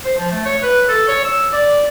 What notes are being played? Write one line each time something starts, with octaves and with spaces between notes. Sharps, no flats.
C5
F3
A3
C#5
B4
A4
C#5
E6
D5